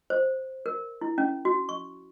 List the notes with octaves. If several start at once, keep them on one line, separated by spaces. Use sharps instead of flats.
C5
A#4
E4
C#4
F#4
C#6